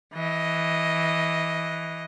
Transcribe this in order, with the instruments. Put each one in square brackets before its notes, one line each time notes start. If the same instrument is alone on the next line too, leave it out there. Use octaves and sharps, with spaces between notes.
[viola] E3 D#5